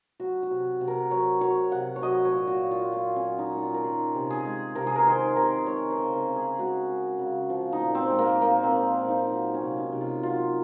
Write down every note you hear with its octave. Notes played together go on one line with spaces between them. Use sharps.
F#3 F#4
F#4
C3
C3
A#4
F#3 C#5
F#3 C#5
C3 F#5
C#5
F#3 D#5
C#5
A#2
F#4
A#2
F4
F#3 F4
C#4
F#3
D#4
A#2
F4
A#4
D#3 G#4
C3
G#4
G#3
C3 A#4
G#4
A#4
D#3 C5
C3 A#4
G#3 C#5
C5
C#3
A#4
C#3
G#4
G#3 F#4
G#3
C#3
F3
D#4
A#2
C4
G#3
A#3
A#2 A#3
C4
F3
A#2
D#4
F#3
C#4
C3
D#4
C3
F4
F#3 F4